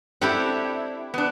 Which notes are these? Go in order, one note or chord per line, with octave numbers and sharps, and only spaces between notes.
C4 D4 E4 G4 A4 F#5
B3 D4